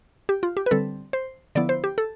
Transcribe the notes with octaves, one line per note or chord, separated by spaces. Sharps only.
G4
F4
G4
B4
D3 G3 C4 A4
C5
D3 F3 B3 E4 D5
C5
G4
A4